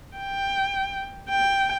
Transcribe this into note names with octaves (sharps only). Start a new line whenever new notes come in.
G5
G5